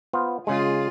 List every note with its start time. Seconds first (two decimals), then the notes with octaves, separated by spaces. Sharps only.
0.13 B3 F4 C5
0.47 C#3 G#3 F4 G#4